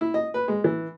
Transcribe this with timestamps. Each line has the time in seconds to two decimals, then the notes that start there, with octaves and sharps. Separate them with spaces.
0.01 E4
0.14 D#5
0.34 B4
0.48 G#3
0.64 E3